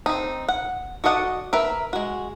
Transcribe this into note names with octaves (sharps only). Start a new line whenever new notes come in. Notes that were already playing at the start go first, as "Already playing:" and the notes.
C4 D#4
F#5
F#4 A4 D5 D#5 F#5
A#4 B4 E5
G#3 F#4